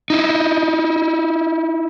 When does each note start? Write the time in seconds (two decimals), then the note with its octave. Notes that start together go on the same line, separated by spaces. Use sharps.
0.10 D#4 E4